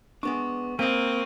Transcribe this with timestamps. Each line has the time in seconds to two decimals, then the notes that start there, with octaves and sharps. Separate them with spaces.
0.23 G#3 B3 D4 C#6
0.79 A#3 C4 D#5 G5 D#7